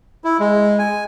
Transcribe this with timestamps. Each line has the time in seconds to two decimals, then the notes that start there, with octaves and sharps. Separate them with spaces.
0.24 E4
0.40 G#3
0.79 G#5